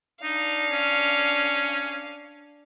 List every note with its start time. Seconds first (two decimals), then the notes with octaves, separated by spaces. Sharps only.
0.23 D4 D#4 F5
0.71 C#4